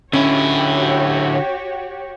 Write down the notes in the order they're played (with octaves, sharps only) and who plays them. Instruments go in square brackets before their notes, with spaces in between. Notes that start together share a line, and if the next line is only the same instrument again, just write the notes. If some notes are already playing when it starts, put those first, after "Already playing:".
[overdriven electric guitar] D3 E4 [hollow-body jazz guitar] C#4 [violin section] F#4 G4 C#5